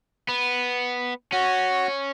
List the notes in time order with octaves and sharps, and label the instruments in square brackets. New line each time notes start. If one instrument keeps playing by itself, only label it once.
[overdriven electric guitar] B3
[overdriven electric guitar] C#4 [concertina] F#4